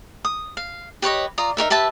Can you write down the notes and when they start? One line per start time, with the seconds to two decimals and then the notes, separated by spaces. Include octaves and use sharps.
0.25 D#6
0.57 F5
1.02 G4 B4 C#5 D#5
1.38 F4 D5 A#5 D#6
1.57 D#4 G4 A#4 E5
1.70 G4 B4 E5 A5